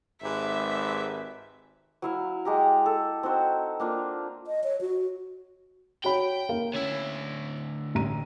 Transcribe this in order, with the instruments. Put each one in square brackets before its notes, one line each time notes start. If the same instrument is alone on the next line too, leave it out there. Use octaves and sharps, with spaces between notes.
[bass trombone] G#1 [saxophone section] G#2 G4 B4 [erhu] E5
[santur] F#3 E4 F5
G#3 G4 A#5
A4
C4 D#4 F#4 C5
A#3 D4 F4
[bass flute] D#5
C#5
F#4
[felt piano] F#4 C#5 B5 [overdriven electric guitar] G5
[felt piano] A#3 A#4 F5
[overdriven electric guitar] D2 E4 [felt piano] C#4
[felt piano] A1 A#5 D#7